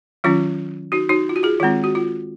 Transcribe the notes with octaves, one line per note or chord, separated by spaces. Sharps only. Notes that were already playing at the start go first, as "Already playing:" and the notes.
D#3 F#3 C#4 F4
D#4 F#4
D#4 F#4
F4
F#4
F4 G#4
D#3 G#3 C4 F4
F#4
F4